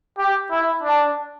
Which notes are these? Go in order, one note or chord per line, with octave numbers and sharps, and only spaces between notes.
G4
E4
D4